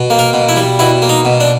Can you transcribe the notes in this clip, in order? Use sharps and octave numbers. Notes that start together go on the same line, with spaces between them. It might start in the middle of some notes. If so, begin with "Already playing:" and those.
Already playing: B2
A#3
A#4
B2
E4
G3
B2 E4
A#3
D#4
B2
D4